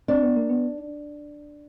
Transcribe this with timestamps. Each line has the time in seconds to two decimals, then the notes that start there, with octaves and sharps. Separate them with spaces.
0.08 C4 D4
0.23 B3
0.36 A#3
0.49 B3